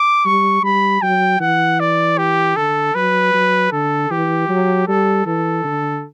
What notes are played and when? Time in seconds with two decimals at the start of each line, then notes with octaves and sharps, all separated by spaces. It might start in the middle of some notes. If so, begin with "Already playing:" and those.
Already playing: D6
0.25 G3 C#6
0.63 G3 B5
1.02 F#3 G5
1.40 E3 F#5
1.80 D5
2.18 G4
2.56 D3 A4
2.95 F#3 B4
3.33 F#3
3.72 D3 A4
4.11 E3 G4
4.49 F#3
4.87 G3 A4
5.26 E3 A4
5.64 D3